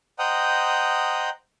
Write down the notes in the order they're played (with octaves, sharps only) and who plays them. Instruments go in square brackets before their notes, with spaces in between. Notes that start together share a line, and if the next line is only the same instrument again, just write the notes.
[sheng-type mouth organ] C5 D#5 F#5 G5 A#5 D#6